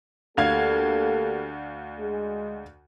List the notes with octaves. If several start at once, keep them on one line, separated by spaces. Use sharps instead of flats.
D2 A#3 G4 A4 F5 G#6
G#3 G#4